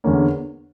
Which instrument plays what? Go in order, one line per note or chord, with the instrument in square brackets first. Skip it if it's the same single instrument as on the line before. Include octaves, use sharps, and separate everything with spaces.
[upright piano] E2 D3 A#3 C#4